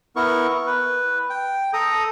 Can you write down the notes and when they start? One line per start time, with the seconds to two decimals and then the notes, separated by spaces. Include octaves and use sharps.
0.16 B3 E4 A#4 C#6
0.67 B4
1.30 G5
1.73 A4 A#5 D#6